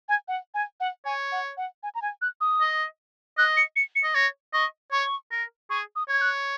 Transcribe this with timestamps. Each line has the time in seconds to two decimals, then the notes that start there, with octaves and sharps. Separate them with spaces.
0.09 G#5
0.28 F#5
0.54 G#5
0.80 F#5
1.05 C#5 G#5
1.32 F#5
1.57 F#5
1.83 G#5
1.95 A#5
2.02 G#5
2.22 F#6
2.41 D#6
2.61 D#5
3.38 D#5 F#6
3.57 C#7
3.76 C#7
3.96 C#7
4.04 D#5
4.15 C#5 A#6
4.53 D#5 C#6
4.92 C#5 C#6
5.32 A#4
5.70 G#4 C#6
5.96 D#6
6.08 C#5 G#6
6.21 F#6